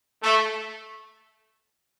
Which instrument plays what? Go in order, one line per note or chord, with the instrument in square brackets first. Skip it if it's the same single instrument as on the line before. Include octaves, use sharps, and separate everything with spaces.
[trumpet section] A3